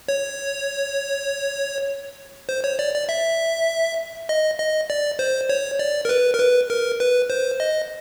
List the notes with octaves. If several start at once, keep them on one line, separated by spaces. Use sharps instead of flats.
C#5
C5
C#5
D5
D5
E5
D#5
D#5
D5
C5
C#5
D5
A#4
B4
A#4
B4
A#4
B4
C5
D#5